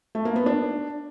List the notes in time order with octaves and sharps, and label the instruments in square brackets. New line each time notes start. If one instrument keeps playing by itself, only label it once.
[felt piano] A3
A#3
B3
D4